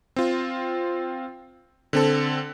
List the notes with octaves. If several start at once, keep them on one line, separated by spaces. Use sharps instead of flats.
C4 F4
D3 C4 A4